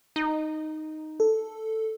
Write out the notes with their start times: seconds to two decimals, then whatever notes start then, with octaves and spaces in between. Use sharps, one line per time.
0.16 D#4
1.20 A4